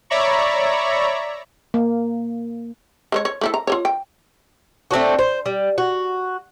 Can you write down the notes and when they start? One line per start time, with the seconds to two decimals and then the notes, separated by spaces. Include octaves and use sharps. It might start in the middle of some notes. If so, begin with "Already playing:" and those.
0.10 C#5 D5 E5 A#5 B5 C#6
1.74 A#3
3.12 G#3 C5 C#5
3.25 C#5
3.41 A3 E4 A4
3.54 A#5
3.67 F4 A4 C#5
3.85 G5
4.91 A3 C4 D4 F#4
5.19 C5
5.46 G3
5.78 F#4